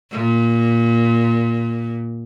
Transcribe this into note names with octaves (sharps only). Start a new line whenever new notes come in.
A#2